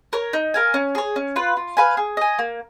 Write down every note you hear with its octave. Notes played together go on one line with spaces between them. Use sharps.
A#4 C#5
D#4
A#4 F5 G#5
C#4
G#4 C#5
C#4
F4 B4
F4
B4 F5 G#5
G#4
D#5 G#5
A#3